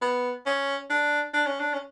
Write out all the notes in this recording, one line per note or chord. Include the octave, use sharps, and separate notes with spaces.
B3
C#4
D4
D4
C#4
D4
C#4